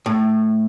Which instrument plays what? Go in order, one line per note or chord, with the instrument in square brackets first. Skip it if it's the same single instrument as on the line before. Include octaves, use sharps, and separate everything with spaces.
[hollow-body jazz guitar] A2